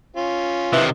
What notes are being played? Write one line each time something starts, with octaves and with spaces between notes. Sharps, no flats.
C#4 F4
C3 D#3 E3